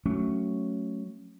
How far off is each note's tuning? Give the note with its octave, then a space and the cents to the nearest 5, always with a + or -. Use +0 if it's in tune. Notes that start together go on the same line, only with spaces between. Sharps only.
F#3 +0 A3 +5 C#4 +0